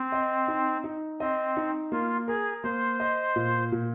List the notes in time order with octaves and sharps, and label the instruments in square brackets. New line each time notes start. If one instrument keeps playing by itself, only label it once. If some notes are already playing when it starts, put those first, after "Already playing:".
Already playing: [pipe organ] C4
[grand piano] D#5
D#4
D#4
[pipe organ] C4 [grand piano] D#5
[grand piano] D#4
[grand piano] A#3 [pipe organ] F4
[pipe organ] G#4 [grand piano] A#4
[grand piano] A#3 [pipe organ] C5
[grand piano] D#5
A#2
A#2